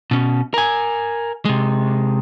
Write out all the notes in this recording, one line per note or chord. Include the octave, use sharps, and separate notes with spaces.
B2 C#4
A#4 G#5
C3 G#3